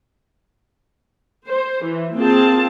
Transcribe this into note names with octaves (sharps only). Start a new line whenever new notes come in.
C5
E3
A#3 C4 F4 G#4 A5